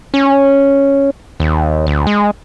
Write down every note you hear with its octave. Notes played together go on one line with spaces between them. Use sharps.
C#4
D#2
D2
G#3